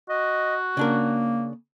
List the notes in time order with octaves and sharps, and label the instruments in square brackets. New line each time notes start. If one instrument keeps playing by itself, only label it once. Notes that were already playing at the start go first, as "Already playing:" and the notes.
[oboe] F#4 [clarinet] D#5
[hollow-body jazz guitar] C#3 D4 A#4 [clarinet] A#3